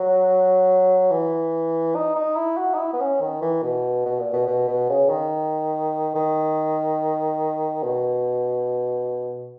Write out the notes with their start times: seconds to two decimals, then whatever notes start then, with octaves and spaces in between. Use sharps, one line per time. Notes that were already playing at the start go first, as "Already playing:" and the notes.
Already playing: F#3
1.11 E3
1.95 D#4
2.16 D#4
2.36 E4
2.57 F#4
2.74 D#4
2.79 E4
2.93 B3
3.00 C#4
3.21 D#3
3.41 E3
3.62 B2
4.05 B2
4.19 A#2
4.33 B2
4.47 B2
4.68 B2
4.89 C#3
5.10 D#3
6.15 D#3
7.83 B2